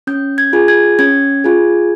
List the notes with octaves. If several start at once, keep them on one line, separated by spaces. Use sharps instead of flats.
C#4 G6
G#6
F4 G#4
G#6
C#4 G#6
F4 G#4